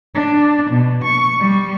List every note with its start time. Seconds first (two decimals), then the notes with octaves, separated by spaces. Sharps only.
0.15 D4
0.71 B2
1.03 C#6
1.40 G3